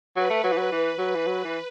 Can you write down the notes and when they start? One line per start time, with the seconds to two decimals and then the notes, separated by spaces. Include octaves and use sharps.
0.16 F#3 B4
0.30 A3
0.44 F#3
0.52 E3
0.57 F#3
0.72 E3
0.98 F#3
1.15 E3
1.26 F#3
1.44 E3